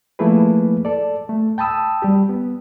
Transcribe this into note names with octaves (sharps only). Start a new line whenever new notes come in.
F3 A3 A#3 E4 G#4 B4
A4 D5
A3
G5 A5 B5 D#6 E6
G3 G4
B3